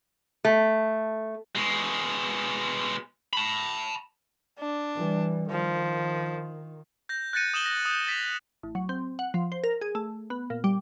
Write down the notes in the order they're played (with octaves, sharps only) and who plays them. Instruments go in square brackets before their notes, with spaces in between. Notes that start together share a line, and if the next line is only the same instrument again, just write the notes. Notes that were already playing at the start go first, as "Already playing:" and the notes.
[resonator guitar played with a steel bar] A3
[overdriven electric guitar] B2 G#3
A5 B5
[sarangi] D4
[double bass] E3 G3
[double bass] D#3 [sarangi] F3
[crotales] G6 A#6
F#6 G6 A6 A#6 C#7 D#7
D#6 E7 F#7 G7
A#6
D#6 G6
A6 B6 D#7 F7
[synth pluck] A1
F#3
C4
F#5
F3
C5
A#4
G#4
A3
B3
A#2
G3